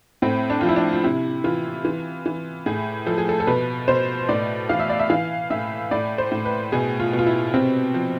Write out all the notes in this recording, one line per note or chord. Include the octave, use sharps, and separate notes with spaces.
A2 C4
D4
F3 F4
E4
D4
F4
C3 E4
E3 F4
E3
E3
A2 G#4
F3 A4
G#4
A4
A4
B2 B4
B2 C5
A2 D5
E3 F5
E5
D5
E5
E3 F5
A2 E5
A2 D5
C5
A2
B4
B2 G#4
F4
B2
F4
E4
C3 C4
F3